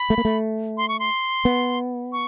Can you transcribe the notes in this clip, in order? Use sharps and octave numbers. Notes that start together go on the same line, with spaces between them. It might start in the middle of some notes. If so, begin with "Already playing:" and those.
Already playing: B5
A3
A#3
A3
C6
C#6
C6
B3
C#6